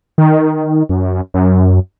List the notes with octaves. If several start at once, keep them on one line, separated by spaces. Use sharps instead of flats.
D#3
F#2
F#2